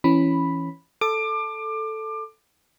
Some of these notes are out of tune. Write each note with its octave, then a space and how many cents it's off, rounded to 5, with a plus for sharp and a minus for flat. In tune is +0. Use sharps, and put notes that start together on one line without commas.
E3 +10 C#4 -10 B5 +0
A4 +0 D6 +25